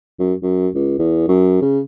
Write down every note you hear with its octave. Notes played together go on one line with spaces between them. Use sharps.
F#2
F#2
C#2
E2
F#2
C#3